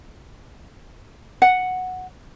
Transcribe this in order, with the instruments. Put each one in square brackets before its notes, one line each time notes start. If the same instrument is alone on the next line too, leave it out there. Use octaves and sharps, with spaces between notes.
[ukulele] F#5